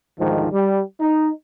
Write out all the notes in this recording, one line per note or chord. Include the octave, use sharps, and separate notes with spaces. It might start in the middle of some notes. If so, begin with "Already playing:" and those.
D2 G#2 D#3 F3
G3
D#4